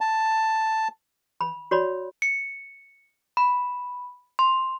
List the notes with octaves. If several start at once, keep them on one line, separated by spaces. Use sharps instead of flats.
A5
B5
F#4 C#5 D5 B5
C#7
B5
C6